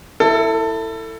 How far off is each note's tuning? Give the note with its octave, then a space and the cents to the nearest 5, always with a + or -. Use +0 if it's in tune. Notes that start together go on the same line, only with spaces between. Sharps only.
E4 +0 A4 +25